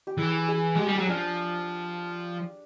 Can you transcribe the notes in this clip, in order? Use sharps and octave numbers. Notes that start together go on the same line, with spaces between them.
G4
E3 G#4
G#4
G#3 G4
G3 G#4
F#3 G4
F3 D4